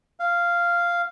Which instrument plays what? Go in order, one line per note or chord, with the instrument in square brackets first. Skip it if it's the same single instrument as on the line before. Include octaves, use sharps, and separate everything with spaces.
[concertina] F5